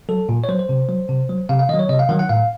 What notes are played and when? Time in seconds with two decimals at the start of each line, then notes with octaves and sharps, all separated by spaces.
0.09 F#3 A4
0.29 A#2
0.44 C#5
0.49 F#3 C5
0.59 C5
0.69 C3
0.89 F#3
1.09 C3
1.29 F#3
1.49 C3 F5
1.59 F5
1.69 D#3 D#5
1.73 F#3
1.79 C#5
1.89 C3 D#5
1.99 F5
2.09 D#3 F#3 F#5
2.19 F#5
2.29 A2 F5